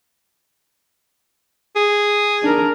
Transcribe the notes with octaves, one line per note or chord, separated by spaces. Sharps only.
G#4
D4 A#4